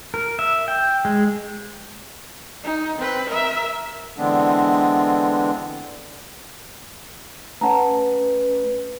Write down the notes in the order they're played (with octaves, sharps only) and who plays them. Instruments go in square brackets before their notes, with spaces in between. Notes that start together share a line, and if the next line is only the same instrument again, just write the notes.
[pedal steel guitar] A#4
E5
G5
G#3
[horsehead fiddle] D#4
C4 B4
A#4 E5
[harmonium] D3 E3 G#3 B3 C4 D4
[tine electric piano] A3 C#4 [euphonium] B4 [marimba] F#5 A5 A#5